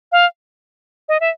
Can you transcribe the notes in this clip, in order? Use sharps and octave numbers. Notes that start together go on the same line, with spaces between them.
F5
D#5
E5